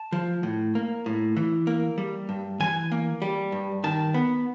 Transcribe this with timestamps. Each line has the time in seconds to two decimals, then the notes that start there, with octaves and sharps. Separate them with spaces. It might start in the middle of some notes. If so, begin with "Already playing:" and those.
Already playing: A5
0.12 F3
0.43 A2
0.75 A#3
1.06 A2
1.37 E3
1.67 A#3
1.98 G3
2.29 G2
2.60 E3 G#5
2.92 A#3
3.22 G3
3.52 G2
3.84 D#3 A5
4.14 B3